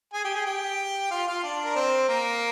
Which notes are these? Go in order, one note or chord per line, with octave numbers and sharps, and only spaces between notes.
G#4 G#5
G4 G5
G#4 G#5
G4 G5
F4 F5
F4 F5
D4 D5
A#4
C4 C5
A#3 A#4